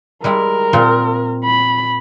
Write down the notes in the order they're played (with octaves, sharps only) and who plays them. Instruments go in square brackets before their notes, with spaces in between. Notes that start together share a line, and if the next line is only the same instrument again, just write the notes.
[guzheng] G3 G#3 E4 [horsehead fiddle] A#4
[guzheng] A#2 C4 F4
[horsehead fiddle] B5